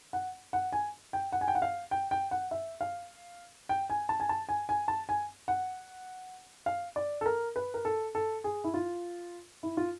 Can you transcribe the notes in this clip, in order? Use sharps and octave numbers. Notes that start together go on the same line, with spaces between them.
F#5
F#5
G#5
G5
F#5
G#5
G5
F#5
F5
G5
G5
F#5
E5
F5
G5
G#5
A5
G#5
A5
G#5
G#5
A5
G#5
F#5
F5
D5
A4
A#4
B4
A#4
A4
A4
G#4
E4
F4
E4
F4